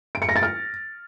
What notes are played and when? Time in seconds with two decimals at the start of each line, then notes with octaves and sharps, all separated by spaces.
0.15 D7
0.22 C#7
0.29 A#6
0.36 A6
0.43 F6